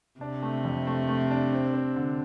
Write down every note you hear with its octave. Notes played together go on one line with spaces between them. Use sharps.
C3 D4
A3
F2
A3
A3
D4
C4
C4
D3